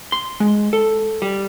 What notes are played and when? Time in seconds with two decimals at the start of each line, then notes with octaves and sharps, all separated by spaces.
0.12 C6
0.40 G#3
0.73 A4
1.22 G3